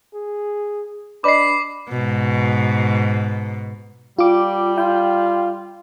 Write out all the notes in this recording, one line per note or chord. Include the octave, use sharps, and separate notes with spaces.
G#4
D4 B4 D5 D#5 B5 D6 C7
G#2 B2
G3 F4 D6
F4 G5